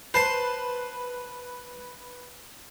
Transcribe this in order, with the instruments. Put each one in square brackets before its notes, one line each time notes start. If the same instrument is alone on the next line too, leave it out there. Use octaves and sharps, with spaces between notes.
[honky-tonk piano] B4 [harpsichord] C5 A5 C6